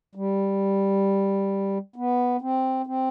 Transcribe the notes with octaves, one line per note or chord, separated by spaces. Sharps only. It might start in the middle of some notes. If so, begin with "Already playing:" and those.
G3
B3
C4
C4